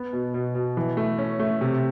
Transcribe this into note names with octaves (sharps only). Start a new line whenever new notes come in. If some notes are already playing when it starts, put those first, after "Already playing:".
Already playing: B3
B2
B2
B2
E3
A3
C#4
A3
C3